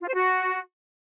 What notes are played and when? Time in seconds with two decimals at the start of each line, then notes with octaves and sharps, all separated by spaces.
0.01 F4
0.07 C5
0.14 F#4